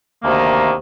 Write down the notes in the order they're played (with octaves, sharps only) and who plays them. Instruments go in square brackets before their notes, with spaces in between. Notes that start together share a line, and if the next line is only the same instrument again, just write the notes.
[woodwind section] D2 C3 D#3 A#3